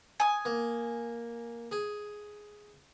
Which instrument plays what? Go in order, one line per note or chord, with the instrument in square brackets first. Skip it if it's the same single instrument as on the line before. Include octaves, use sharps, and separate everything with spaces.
[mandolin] G#5 D#6
[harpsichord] A#3
G#4